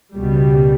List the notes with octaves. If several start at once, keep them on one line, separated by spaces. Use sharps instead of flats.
C#2 B2 G3